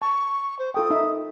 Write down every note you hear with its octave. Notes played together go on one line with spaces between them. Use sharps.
A5 C#6
C5
F4 A4 G5 D#6
D#4 E5